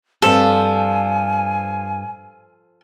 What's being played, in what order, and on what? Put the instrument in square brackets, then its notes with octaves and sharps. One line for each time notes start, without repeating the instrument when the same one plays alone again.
[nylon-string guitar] G2 C4 G4 [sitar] F3 [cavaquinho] A4 [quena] G#5